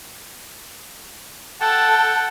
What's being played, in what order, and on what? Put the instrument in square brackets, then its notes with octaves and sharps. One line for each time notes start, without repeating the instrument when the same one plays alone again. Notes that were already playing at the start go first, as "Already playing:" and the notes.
[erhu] A4 [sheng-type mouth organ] F#5 G5 A5